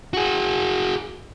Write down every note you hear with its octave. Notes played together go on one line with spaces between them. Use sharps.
F#4 G#4